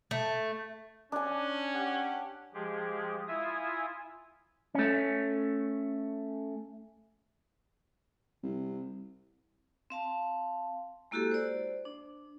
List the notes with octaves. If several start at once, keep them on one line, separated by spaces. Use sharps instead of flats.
A3
C#4 D4 G#5
G4 F#5
F3 G#3 G4 G#4
E4 F4 E5 G#5 D#6
A3 C#4
C2
C4 F5 A5
G#3 A#3 E4 F#4 G4 A4
C5 D5
D4